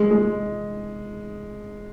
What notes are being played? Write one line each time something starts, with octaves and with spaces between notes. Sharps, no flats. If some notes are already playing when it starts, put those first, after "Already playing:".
Already playing: G#3
G#3